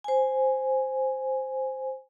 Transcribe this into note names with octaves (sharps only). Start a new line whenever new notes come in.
C5 G#5